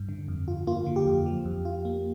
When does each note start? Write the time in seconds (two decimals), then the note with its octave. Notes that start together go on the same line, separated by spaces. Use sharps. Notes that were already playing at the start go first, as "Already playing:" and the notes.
Already playing: G2
0.09 D3
0.28 F2
0.48 F4
0.67 A#3 F4
0.86 D3
0.96 G4
1.06 F2
1.26 F3
1.45 F2
1.65 F4
1.85 A#3